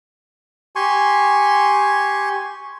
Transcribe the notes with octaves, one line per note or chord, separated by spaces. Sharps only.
G4 G#5 C6 C#6